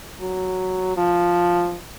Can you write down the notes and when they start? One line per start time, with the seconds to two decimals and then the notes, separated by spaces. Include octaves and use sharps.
0.21 F#3
0.97 F3